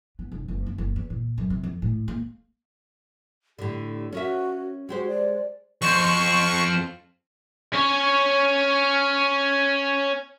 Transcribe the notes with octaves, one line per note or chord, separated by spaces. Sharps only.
B3
F1
F#1
C#4
F#1
E2
A#2
F#2
C3
F2
A2
A#3
A2 D3 G4
C#4 F#4 A#4 E5
G#3 F#4 G4 C5
D5
F2 C5 C#6
C#4 C#5